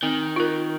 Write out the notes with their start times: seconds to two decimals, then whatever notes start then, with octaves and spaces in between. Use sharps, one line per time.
0.03 D#3 C4
0.36 F4 A#4